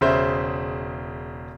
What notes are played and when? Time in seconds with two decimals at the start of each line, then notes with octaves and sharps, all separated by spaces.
0.01 E1 C#3 C5 E5